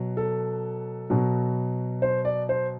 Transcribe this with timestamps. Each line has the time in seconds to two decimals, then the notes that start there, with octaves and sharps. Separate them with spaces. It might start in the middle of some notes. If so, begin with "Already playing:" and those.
Already playing: B2 F#3
0.17 A4
1.10 B2 F#3
2.02 C5
2.25 D5
2.49 C5